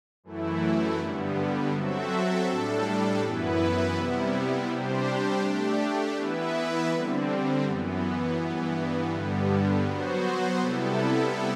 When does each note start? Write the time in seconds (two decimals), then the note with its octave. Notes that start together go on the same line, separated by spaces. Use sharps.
0.24 F#2 E3 A3 E4
0.98 G2 D3 G3 B3
1.72 F#3 C4 F#4 A4 E5
2.46 A2 G3 D4 A4
3.20 F#2 E3 B3 E4 B4
3.93 C3 G3 B3 E4
4.68 C3 G3 D4 G4 C5
5.42 A3 D4 G4
6.15 E3 B3 E4 B4 E5
6.90 D3 G3 C4
7.64 F#2 E3 B3
8.38 G2 E3 B3
9.12 G2 D3 G3 B3
9.86 F#3 B3 F#4 C5
10.59 C3 G3 B3 E4 A4